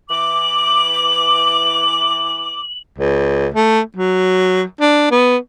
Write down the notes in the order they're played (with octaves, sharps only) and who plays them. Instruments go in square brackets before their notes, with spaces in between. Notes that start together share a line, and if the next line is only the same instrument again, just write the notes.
[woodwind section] E3 D6 [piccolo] F#7
[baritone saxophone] C#2
A3
F#3
D4
B3